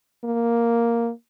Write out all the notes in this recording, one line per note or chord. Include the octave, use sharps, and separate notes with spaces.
A#3